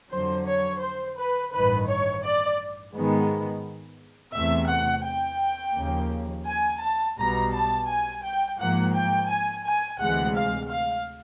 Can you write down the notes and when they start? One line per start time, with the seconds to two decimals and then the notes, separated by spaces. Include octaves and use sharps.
0.10 F2 D3 F#3 C5
0.46 C#5
0.81 C5
1.17 B4
1.52 A1 G2 D#3 B4
1.88 C#5
2.23 D5
2.94 G#2 D#3 G#3 B3
4.35 E2 C3 E3 A3 E5
4.70 F#5
5.06 G5
5.76 D#2 C#3 F3 A#3
6.47 G#5
6.82 A5
7.18 B1 B2 G3 B3 A#5
7.53 A5
7.89 G#5
8.24 G5
8.59 G#2 F3 A#3 F#5
8.95 G5
9.29 G#5
9.64 G#5
10.00 D2 C3 E3 G#3 F#5
10.36 F5
10.71 F5